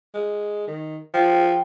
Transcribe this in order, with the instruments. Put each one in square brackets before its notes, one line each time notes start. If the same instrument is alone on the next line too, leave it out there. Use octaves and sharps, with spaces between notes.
[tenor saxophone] G#3
D#3
[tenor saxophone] F3 [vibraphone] G5